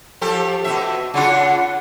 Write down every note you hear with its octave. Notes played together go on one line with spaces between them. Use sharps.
F3 G4 A4
B2 D#3 E5
C#3 D4 F4 F#5